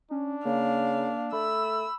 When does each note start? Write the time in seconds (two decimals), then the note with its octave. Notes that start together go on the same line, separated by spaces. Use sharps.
0.11 C#4 D4
0.45 C#3 A#3 F5
1.33 A3 B5 E6